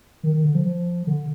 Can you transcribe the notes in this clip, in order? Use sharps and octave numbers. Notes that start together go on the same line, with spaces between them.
D#3
D#3
D3
F3
F3
D3